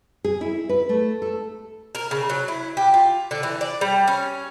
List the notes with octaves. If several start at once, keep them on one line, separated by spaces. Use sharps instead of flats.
G#4
E4
B4
A3
A4
A#4
C#3
F#3
E4
G4
F4
D3
E3
D5
G3
C#4